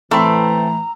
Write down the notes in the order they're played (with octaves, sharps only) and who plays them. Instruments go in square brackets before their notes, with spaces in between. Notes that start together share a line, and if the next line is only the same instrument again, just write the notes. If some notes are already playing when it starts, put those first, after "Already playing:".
[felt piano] A2 B5 E6 [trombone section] E3 [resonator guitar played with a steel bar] A3 C4 [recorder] A#5